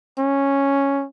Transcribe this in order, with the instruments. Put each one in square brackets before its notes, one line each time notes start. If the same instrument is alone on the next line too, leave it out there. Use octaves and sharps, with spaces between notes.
[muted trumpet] C#4